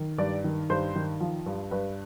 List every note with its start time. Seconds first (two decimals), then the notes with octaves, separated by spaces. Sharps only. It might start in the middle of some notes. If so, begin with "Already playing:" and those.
Already playing: D#3
0.18 G2 D5
0.44 D#3
0.69 G2 C5
0.96 D#3
1.20 F3
1.46 G2
1.71 G2 B4